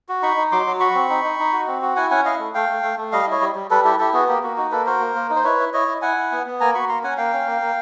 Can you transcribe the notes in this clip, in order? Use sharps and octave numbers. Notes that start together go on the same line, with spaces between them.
F#4
D#4 B5 C#6
D#4
F#3 C6 D6
F#3
F#4 B5 C#6
C4
D#4
D#4
D#4
F#4
C4
F#4
E4 F#5 G#5
C#4 F#5 G#5
E4 D#5 F5
A3
A3 F5 G5
A3
A3
A3
G3 D#5 F5
E4 C#5 D#5
G3
G3
G3 A4 B4
E4 G4 A4
E4 G4 A4
B3 F#4 G#4
A#3 G4
A#3 F#4
D#4 F#4
A#3 A4 B4
F#4 A#4 C5
A#3
A#3
D#4
C5
E4 B4 C#5
E4
E4 C#5 D#5
E4
E4 F#5 G#5
E4
B3
B3
A#3 G#5 A#5
F#4 B5 C#6
A#3 A#5 C6
C#4 F#5 G#5
A#3 F5 G5
C#4
A#3
A#3